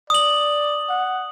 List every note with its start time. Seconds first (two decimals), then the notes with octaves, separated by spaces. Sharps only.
0.10 D5 D#6 F#7
0.89 F#5